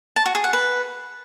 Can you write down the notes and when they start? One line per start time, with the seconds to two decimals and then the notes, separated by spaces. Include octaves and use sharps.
0.16 A5
0.26 F#4
0.35 G#4
0.44 F#5
0.53 B4